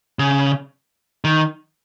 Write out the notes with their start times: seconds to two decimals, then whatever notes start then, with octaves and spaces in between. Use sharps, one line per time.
0.19 C#3
1.24 D#3